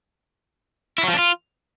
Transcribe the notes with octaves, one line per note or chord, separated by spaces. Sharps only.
E4
F#3
F3
D4
F4